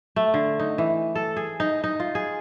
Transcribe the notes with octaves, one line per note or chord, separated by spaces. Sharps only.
A3
D3
D#4
E3
A4
G#4
D#4
D#4
F4
G#4